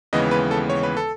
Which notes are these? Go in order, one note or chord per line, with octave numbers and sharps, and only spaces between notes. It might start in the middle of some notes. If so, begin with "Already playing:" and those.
D#2 C#3 E3 G#3 B3 D#5
B4
A4
C#5
B4
A4